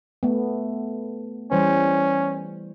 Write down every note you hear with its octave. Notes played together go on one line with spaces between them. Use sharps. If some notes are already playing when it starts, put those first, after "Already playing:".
A3 B3
E3 G3 C#4 C5